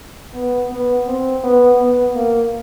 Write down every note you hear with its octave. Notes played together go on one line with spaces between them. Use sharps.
B3
B3
C4
B3
B3
A#3